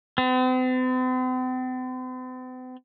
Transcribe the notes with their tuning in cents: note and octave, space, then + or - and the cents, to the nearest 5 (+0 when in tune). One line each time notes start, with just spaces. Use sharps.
C4 -45